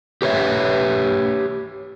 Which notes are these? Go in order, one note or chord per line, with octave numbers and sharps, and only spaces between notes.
G4 B4 C#5 E5